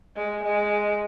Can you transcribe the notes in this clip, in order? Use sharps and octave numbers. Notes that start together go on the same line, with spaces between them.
G#3
G#3